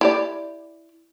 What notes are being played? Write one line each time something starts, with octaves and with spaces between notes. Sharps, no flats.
E4 G4 D5